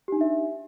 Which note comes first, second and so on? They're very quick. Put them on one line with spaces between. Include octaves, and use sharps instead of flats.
G4 D#4 D4 E5